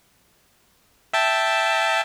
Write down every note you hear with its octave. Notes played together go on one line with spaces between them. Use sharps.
E5 G5 A5